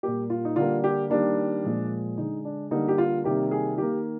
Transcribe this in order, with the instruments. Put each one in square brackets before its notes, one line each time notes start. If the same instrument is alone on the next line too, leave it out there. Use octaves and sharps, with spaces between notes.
[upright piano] A#2 G3 A#3 G4
F4
D#4
D3 G3 A#3 F4
G4
D#3 G3 A#3 D4
A#2 F3 G#3
D3 G#3 D#4
D4
D3 G3 A#3 D#4
G4
F4
C3 D#3 G3 A#3 G4
G#4
D#3 A#3 G4